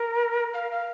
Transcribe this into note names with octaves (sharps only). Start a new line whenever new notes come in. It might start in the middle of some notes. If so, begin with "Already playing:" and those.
Already playing: A#4
F5
F5